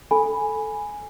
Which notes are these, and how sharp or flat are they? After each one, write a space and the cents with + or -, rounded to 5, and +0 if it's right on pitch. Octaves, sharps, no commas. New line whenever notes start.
A4 +0 G#5 +0 B5 +0